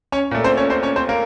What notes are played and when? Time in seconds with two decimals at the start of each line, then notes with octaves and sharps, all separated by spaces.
0.12 C#4 C#5
0.31 A#2 A3
0.44 C4 C5
0.57 C#4 C#5
0.70 C4 C5
0.83 C#4 C#5
0.96 C4 C5
1.09 A#3 A#4